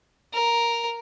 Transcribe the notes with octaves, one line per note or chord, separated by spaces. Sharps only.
A#4